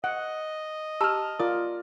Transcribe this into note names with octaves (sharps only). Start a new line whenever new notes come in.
D#5 F#5
G4 A5 A#5 E6 F6
F4 A#4 D5 D#6